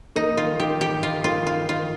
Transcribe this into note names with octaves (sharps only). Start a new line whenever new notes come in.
A#3 D#4
D#3 F4
D#3 G4
D#3 G4
D#3 F4
D#3 F4
D#3 F4
D#3 F4